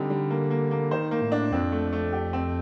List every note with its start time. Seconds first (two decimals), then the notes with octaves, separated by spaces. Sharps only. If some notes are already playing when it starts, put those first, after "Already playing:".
Already playing: D3 G3 C4 D#4
0.10 G3
0.30 A#3
0.51 A#3
0.71 A#3
0.91 D#3 C5
1.11 A#3
1.22 A2
1.32 D4
1.51 F2 C4
1.72 A3
1.93 A3
2.12 G4
2.33 C4